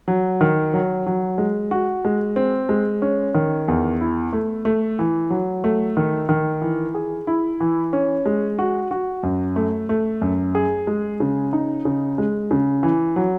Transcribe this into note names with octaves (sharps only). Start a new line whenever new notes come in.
F#3
D#3
F#3
F#3
G#3
F#4
G#3
C4
G#3
C#4
D#3
E2
E4
A3
A3
E3
F#3
A3
D#3
D#3
E3
G#4
E4
E3
C#4
G#3
F#4
F#4
F#2
A3
A3
F#2
G#4
G#3
C#3
D#4
C#3
G#3
C#3
E3
F#3